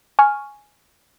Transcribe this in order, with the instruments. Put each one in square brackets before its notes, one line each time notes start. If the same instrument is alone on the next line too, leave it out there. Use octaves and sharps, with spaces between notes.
[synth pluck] G#5 C#6 F6